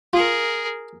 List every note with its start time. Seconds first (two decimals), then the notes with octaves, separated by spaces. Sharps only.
0.13 F4 G#4 A#4